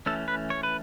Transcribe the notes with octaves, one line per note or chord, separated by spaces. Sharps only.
E3 A3 C#4 A4
B4
C#5
B4